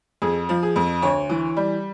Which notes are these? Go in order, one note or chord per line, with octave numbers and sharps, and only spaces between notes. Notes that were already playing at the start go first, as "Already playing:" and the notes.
F2 G#4
F3
G#4
F2
D2 C#5
E3
G3